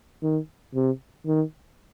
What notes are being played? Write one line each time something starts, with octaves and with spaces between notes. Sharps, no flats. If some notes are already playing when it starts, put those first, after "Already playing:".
D#3
C3
D#3